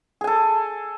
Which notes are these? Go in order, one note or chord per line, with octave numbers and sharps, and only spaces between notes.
G#4 A4 G#5